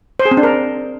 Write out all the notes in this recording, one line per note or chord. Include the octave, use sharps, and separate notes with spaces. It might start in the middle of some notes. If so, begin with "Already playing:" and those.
C5
G#4
C4
D4
A#4